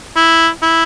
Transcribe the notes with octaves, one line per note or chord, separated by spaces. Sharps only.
E4
E4